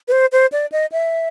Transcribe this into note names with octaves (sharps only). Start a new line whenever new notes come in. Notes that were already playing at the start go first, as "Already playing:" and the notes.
B4
C5
C5
D5
D#5
E5